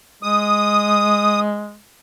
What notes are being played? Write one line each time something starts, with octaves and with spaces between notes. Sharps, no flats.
G#3 D#6